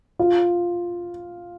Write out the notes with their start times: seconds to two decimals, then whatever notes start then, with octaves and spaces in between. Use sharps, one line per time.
0.19 F4